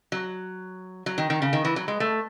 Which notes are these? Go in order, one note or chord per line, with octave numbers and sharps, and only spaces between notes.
F#3
F#3
D#3
D#3
C#3
D#3
E3
F#3
G#3
A3